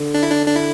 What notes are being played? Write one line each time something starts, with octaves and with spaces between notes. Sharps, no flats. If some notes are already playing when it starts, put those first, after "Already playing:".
Already playing: D3
D4
E4
D4
D4
E4